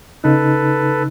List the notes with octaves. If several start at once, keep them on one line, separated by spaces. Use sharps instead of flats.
C#3 D#4 A4 B4